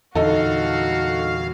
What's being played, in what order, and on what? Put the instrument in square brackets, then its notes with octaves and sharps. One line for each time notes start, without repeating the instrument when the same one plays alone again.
[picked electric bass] E2 A#2 D3 [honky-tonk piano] D#4 A4 [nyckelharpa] F#4 [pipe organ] F5